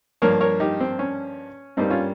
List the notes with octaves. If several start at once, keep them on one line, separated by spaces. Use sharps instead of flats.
G2 F3 A#3 A#4 C#5
A#4 C#5
D#4 G4
C4
C#4
G2 G3 A#3 C4 D#4
C#4 F4